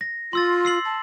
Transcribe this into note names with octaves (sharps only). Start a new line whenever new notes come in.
A#6
F4 C6 E6 A6
E6 C7 F#7
A5